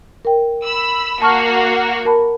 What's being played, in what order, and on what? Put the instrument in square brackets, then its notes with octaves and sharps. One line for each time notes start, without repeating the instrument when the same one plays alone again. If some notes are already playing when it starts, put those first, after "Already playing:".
[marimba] A#4 G5
[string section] B5 E6
[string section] A#3 F#4 [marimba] A5 C#6 F6
[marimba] A#4 A5 B5